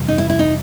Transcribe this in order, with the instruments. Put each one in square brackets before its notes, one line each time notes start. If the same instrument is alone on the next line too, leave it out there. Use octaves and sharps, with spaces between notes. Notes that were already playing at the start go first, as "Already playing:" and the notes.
Already playing: [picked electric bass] F2 C3 E3 G3
[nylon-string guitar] D#4
E4
E4
D#4